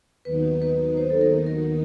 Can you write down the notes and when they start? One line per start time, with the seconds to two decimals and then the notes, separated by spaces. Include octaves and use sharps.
0.25 D#2 D#3 F#3 B3 D#4 B4
0.62 B4
0.97 C5
1.10 A4
1.21 A#4
1.46 A#4